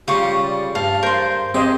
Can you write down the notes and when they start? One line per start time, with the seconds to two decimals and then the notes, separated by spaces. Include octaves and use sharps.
0.08 C#3 G3 F4 G4 C#6
0.43 D5
0.75 G2 F5 A5
1.03 A#4 C5 C6
1.54 C4 G4 G#4 C5 D#5